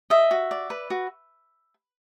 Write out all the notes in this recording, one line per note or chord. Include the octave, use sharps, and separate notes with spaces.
D#5 E5
F#4
D5
B4
F#4